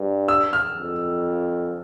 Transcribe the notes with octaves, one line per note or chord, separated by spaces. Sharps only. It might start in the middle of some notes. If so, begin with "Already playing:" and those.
Already playing: G2
E6
F6
F2